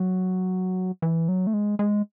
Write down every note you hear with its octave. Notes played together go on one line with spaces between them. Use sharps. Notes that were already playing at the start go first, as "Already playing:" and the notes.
Already playing: F#3
E3
F#3
A3
G#3
G#3